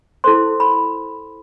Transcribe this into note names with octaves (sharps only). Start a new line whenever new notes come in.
E4 A4 C5 C6
B5